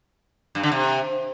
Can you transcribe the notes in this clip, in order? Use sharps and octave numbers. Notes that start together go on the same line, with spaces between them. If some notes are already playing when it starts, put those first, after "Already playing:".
G2
D3
C3